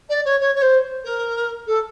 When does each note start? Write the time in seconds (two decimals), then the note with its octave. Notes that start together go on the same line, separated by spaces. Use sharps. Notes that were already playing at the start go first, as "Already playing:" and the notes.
0.09 D5
0.24 C#5
0.40 C#5
0.54 C#5
0.61 C5
1.04 A#4
1.66 A4